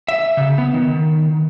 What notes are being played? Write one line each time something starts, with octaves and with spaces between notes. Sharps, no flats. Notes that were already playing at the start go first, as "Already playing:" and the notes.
E5
C#3
B3
D#3